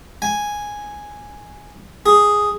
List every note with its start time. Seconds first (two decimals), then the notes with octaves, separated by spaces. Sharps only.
0.22 G#5
2.06 G#4